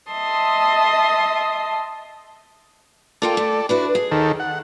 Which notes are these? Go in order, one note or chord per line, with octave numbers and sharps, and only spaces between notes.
D#5 E5 A5 C6 D#6
A#3 F4 A4 D5 G5
A3
D4 E4 F#4 B4
G#4
D#2 D#3 A4
F#5